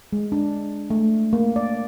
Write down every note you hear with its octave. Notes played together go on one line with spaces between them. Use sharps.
G#3
D4
A3
A#3
D5